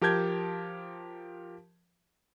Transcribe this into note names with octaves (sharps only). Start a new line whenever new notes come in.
F3 G4 A#4 A5 G6 G#6